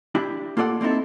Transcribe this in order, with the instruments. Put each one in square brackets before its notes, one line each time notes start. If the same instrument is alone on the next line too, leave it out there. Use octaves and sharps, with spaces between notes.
[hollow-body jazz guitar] D4 E4 G4
A#3 F4 A4 D5 F#5
A#3 C4 D#4 E4 A4